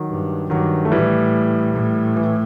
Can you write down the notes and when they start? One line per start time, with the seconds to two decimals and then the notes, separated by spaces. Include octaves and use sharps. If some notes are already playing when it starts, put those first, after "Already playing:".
Already playing: D#3 F#3
0.09 G2
0.50 G2 D#3 F#3
0.85 A3
0.92 A2 E3 G3
1.74 A2
2.16 E3